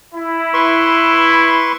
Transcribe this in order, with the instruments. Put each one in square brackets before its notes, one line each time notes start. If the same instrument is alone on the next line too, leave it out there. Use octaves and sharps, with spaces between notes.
[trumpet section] E4
[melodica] B4 C6 C#6